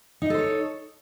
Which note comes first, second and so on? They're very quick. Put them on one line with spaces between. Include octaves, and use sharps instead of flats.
D#4 D#5 A4 C5 C#5